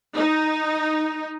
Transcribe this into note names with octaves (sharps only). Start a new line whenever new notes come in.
D#4